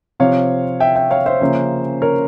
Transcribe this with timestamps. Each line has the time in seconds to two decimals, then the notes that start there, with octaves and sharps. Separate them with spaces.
0.20 C3 F3 C4 C#5 F5
0.80 E5 G5
0.96 E5 G5
1.11 C#5 F5
1.26 C5 E5
1.41 C#3 F3 A#3 C#4
2.02 A#4 C#5